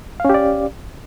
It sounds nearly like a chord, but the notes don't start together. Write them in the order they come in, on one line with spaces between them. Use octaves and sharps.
F5 C#4 G4 D5